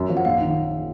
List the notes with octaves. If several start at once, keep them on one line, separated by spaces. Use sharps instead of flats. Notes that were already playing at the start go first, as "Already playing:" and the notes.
Already playing: F#2
F3
F#5
A#1 F5
D#3